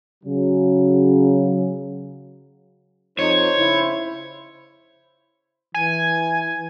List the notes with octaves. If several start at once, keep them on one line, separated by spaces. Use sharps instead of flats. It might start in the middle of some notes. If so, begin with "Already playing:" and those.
C#3 F#3
F2 D#4 C5 C#5
C#3 E4
E3 G#5